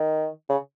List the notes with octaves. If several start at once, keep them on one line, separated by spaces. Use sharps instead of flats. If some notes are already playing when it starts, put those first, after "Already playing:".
Already playing: D#3
C#3